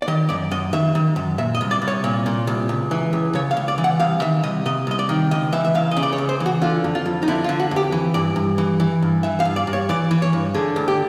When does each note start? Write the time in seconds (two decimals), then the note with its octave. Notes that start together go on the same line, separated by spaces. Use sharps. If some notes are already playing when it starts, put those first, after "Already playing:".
0.02 D5
0.08 D#3 D#5
0.29 F#2 D5
0.51 F#2 D#5
0.73 D#3 E5
0.95 D#3
1.16 F#2
1.38 A#2 E5
1.55 D#5
1.61 C2
1.71 D5
1.82 C2
1.88 C#5
2.04 A#2
2.26 A#2
2.47 C2
2.69 C#2
2.91 E3
3.13 C#2
3.35 C#3 C#5
3.51 F5
3.57 C#2
3.68 D5
3.78 E3
3.84 F#5
4.00 C2 F5
4.22 D#3 E5
4.43 C2 D#5
4.66 C3 D#5
4.87 C2 D#5
4.99 D5
5.09 D#3
5.31 C#2 D#5
5.53 E3 E5
5.65 E5
5.75 C#2 F5
5.91 D#5
5.97 C#3
6.03 D5
6.13 C#5
6.18 C#2
6.29 C5
6.40 E3
6.46 F#4
6.62 D3 F4
6.84 F2
6.95 F4
7.06 F2
7.23 D#4
7.28 D3 E4
7.44 F4
7.49 D3
7.60 F#4
7.71 F2 G4
7.92 E3
8.14 G2 D5
8.36 G2
8.58 E3
8.80 E3
9.02 G2
9.23 E3 E5
9.40 F5
9.45 G2
9.56 D5
9.67 G2
9.73 C#5
9.89 E3 D5
10.11 E3
10.22 C#5
10.33 G2
10.55 D3 G#4
10.76 D2
10.88 G4